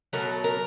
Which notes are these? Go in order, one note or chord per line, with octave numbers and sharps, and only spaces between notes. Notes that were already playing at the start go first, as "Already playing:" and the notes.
B2 F#3 A3 A#4
A#4